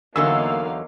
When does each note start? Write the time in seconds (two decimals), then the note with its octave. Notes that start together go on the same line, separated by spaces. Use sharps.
0.16 E2 D3 F#3 A#3 D#4 F5 E6